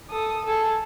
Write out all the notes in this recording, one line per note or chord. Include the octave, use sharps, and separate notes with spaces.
A4 D#6
G#4 A4